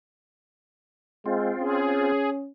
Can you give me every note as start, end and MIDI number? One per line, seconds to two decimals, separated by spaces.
1.26 1.53 56
1.26 2.12 60
1.26 2.12 65
1.61 2.50 61
1.61 2.29 68